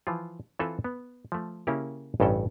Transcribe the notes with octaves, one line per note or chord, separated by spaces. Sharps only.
E3 F3 F4
E3 C4 F4 A4 B4 E5
B3
F3 A3
C#3 A#3 C#4 E4 G4 A#4
A1 G2 C#3 C#4 A4 G5